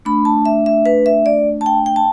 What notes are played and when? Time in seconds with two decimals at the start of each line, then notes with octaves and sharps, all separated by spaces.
0.05 A3 D4 B5
0.25 A5
0.46 E5
0.66 E5
0.86 B4
1.06 E5
1.26 D5
1.61 A5
1.66 G5
1.86 G5
1.96 A5